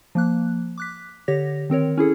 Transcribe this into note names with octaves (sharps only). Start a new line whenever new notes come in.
F3 A#3 F#6
D6 F#6 B6
D3 G4 C#5 A#6
D#3 C4 A#4 C#5
C#4 E4 G#4 A4